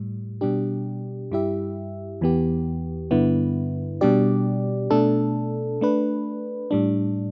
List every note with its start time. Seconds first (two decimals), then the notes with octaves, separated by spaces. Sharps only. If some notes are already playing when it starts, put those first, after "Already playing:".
Already playing: A2 G3
0.41 B2 G3 D4 G4
1.31 G2 G3 E4 G4 E5
2.21 E2 E3 B3 G4
3.11 G2 D3 B3 E4
4.01 B2 G3 D4 G4 D5
4.91 B2 A3 D4 A4
5.81 A3 D4 B4
6.71 A2 G3 D4